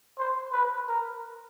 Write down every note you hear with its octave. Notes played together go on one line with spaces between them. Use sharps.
C5
B4
A#4